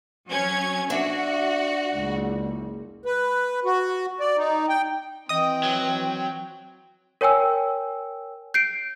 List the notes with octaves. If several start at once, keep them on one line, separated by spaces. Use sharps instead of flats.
F#3 C#4 G#6
D4 F#4 E5
F#1 C#2
B4
F#4
D5
D#4
G5
E3 C4 D#5 G5 D#6
F#3
A#4 C#5 G5 G#5 E6
G6 C7 D7